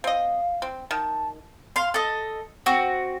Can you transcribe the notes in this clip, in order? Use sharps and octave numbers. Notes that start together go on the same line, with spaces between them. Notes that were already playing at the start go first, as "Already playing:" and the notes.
C4 D#5 F5
C4
D#3 A5
F5 C6
A4 D#5
C4 F#4